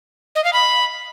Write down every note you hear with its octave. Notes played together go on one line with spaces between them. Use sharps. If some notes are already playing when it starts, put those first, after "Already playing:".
D#5
F5
B5